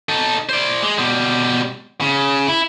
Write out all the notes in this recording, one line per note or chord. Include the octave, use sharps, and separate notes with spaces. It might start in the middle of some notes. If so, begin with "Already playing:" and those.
D#4 A4
C5 D5
G#3
B2 G3
C#3
E4